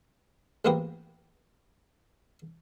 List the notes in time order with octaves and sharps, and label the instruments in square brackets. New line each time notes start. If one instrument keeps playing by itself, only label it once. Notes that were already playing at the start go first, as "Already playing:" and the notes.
[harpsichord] A1 G#2 A#3 B3 A#4 G5